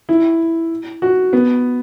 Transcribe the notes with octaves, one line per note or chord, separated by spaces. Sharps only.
E4
F#4
B3